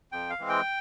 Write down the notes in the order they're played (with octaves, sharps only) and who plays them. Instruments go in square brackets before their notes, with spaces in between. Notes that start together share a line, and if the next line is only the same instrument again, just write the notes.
[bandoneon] F2 G5
F5
E3 G#3 C4
G5